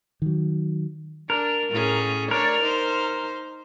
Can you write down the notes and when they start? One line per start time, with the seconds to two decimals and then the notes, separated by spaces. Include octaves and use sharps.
0.22 D#3 F#3
1.30 D4 A#4
1.71 A2 C#4 G#4
2.31 D4 A#4 C#5 D5
2.61 D#4 C5